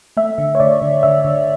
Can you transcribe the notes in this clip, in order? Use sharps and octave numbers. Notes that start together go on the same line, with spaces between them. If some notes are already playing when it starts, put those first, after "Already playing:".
A3 E5
D3
C#5
D3 D5
D3
D3 E5
D3